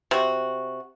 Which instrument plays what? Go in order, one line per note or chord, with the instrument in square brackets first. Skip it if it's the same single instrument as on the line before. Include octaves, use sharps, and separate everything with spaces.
[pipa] C3 F#4